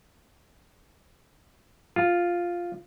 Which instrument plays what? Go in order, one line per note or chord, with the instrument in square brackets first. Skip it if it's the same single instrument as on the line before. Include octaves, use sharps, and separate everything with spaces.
[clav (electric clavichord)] F4